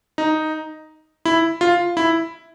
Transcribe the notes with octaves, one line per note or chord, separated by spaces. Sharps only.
D#4
E4
F4
E4